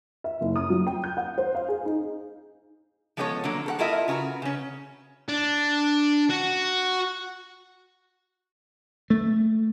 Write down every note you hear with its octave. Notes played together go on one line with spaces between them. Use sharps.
E5
F#1
D#6
F#3
G5
G6
F#5
C5
F5
G#4
D#4
F3 G#3 B3 D4 A4 C#5
D3 F#3 A#3
A4 A#4 F#5
E4 F4 A4 A#4 D#5 E5
C#3 F#4 B4 A#5
C#3 C#4
D4
F#4
A3